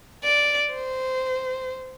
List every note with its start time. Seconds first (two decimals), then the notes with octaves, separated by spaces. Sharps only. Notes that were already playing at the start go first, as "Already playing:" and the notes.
0.24 D5
0.73 C5